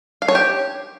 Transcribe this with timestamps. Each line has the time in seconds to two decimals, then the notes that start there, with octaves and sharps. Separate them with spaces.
0.22 F5
0.28 C#5
0.35 G4